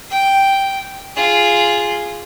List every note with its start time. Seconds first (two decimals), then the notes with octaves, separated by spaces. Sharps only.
0.10 G5
1.16 F4 G#4